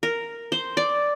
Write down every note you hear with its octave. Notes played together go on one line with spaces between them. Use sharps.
A#4
C5
D5